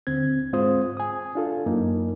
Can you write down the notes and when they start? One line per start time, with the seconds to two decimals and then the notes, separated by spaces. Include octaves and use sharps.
0.07 D#2 D3 C4 G#6
0.53 G#2 G#3 C4 F4 C5 D#6
0.97 G#5 D#6
1.35 D4 F4 A4
1.66 F#2 A#3 D#4